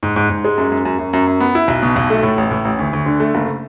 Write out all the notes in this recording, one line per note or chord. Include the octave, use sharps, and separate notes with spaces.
G#2
G#2
G#2
G#3
F#2
F#2
F#2
F#2
F#2
F#2
B3
E4
B1
B2
B1
A3
A2
A1
A2
A1
D2
D2
D3
A3
F#1